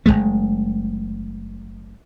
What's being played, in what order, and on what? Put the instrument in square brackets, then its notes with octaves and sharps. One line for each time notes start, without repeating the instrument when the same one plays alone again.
[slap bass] F#1 F#2 G#3 A3